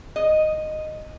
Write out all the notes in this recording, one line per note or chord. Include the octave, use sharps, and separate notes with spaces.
D#5